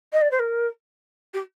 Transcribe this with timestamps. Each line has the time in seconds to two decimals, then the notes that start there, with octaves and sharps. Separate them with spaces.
0.13 D#5
0.21 D5
0.31 C5
0.39 A#4
1.34 G4